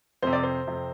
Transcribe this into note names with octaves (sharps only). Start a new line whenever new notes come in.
F2 C3 C5
D5
C5
F2 C3